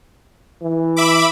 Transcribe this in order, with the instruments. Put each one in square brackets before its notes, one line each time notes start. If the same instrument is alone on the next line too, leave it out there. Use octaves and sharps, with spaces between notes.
[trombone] E3
[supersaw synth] E5 B5 D6